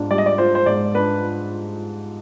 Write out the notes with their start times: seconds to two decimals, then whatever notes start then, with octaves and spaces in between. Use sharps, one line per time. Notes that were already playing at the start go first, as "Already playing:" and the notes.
Already playing: G#2 D4 F4
0.11 G3 D5
0.18 D#5
0.26 D5
0.38 F4 C5
0.55 C5
0.66 G#2 D5
0.94 D4 B4